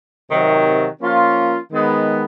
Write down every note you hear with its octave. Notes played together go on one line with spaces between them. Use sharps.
C3 D#3 F#3
F3 A#3 C#4 F4
D#3 G#3 B3